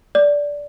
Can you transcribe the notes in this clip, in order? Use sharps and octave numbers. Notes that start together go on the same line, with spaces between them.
D5